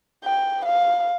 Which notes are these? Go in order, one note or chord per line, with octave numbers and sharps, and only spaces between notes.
G5
F5